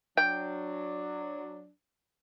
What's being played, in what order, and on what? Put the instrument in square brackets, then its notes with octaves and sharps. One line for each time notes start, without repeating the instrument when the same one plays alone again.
[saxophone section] F#3 D4 [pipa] G5